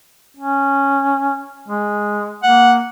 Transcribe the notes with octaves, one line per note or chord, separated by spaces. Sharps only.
C#4
G#3
A#3 F#5